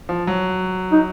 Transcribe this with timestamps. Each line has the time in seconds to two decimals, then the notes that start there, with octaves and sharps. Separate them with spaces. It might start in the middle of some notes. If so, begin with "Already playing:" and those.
0.09 F3
0.27 F#3
0.92 D#4